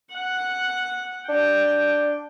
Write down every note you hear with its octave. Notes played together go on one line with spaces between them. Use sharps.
F#5
D4 G5